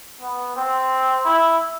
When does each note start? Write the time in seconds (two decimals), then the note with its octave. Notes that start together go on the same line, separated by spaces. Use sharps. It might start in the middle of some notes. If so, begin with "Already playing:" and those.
0.21 B3
0.56 C4
1.25 E4